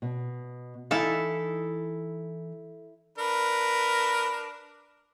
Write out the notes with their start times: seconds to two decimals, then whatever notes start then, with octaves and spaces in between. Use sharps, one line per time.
0.02 B2
0.91 E3 D#4 E4 A4 F5
3.18 D4 A#4 B4